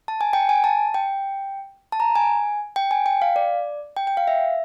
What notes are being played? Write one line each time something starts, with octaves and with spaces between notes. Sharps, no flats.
A5
G#5
G5
G#5
A5
G5
A5
A#5
G#5
G5
G#5
G5
F5
D5
G5
G5
F5
E5